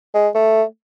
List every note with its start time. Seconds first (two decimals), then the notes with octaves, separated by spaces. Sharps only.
0.14 G#3
0.35 A3